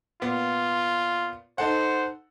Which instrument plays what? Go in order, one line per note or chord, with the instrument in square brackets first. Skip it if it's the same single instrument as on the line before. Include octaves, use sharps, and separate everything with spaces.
[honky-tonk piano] A#2 B3 [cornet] F4
[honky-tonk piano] D#4 A4 F#5 [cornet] C5